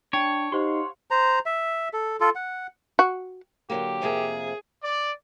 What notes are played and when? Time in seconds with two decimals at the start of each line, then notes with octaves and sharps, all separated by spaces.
0.13 D4 C#5 G5
0.52 D#4 G4 C5 F5 F#5 C6
1.11 C5 A#5
1.46 E5
1.93 A4
2.20 F4 A4
2.35 F#5
2.99 F#4
3.70 D3 F#3 A#3 G4
4.02 F2 C3 A#3 G#4
4.83 D5